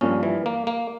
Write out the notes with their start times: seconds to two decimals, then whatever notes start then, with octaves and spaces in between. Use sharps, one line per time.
0.01 G2 F3 A#3 C#4
0.23 E3
0.46 A#3
0.67 A#3